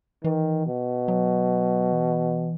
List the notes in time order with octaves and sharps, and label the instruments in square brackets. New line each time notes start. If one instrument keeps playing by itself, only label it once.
[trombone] D#3 [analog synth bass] E3
[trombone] B2
[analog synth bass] F#3
E3